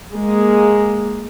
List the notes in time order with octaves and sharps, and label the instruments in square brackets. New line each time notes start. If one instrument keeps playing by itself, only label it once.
[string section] G#3 A#3